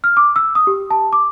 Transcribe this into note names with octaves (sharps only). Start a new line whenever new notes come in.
F6
D6
E6
D#6
G4
A5
D6